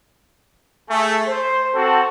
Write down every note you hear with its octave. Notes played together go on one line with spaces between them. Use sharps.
A3 G#4
C5
C4 F#4 A4